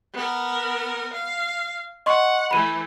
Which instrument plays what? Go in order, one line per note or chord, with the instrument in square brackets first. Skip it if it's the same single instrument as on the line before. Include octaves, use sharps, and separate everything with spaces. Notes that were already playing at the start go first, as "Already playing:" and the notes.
[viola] B3 A#4
F5
[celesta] D#5 C6 C#6 [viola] F#5
[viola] E3 A3 [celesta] B5 D#7